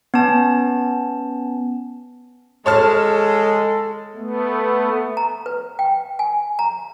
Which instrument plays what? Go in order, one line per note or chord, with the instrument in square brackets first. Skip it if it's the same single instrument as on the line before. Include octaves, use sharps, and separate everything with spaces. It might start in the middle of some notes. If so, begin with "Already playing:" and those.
[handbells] B3 C#4 A5
[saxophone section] G#3 [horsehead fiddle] A4 [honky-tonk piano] C#5 A5 F6
[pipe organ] A3 B3
[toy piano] A#5
B4
G5
G#5
A#5